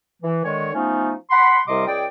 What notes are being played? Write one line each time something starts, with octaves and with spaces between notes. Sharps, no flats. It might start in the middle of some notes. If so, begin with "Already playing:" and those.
E3
D3 D#3 G#3 C#5
F3 A3 B3 C#4 D#4
F#5 B5 C6
C2 C3 G3 D#5 C6 D6
C#2 G#4 D5 G5